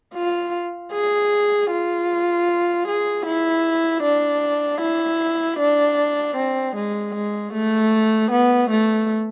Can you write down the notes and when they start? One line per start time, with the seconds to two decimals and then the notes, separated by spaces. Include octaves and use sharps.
0.15 F4
0.93 G#4
1.71 F4
2.87 G#4
3.26 E4
4.03 D4
4.81 E4
5.60 D4
6.37 C4
6.76 G#3
7.15 G#3
7.53 A3
8.31 B3
8.70 A3